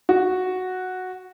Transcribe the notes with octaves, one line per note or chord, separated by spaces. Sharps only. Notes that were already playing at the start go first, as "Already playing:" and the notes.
F#4